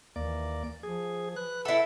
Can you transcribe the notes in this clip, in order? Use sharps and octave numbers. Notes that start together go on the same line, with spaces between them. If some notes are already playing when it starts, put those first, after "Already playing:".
D#2 E3 A#3 D5
F3 G#4
B4 F#6
E4 A4 E5 F#5 E6